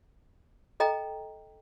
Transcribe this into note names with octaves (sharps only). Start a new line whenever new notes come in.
A4 D#5 G5 A#5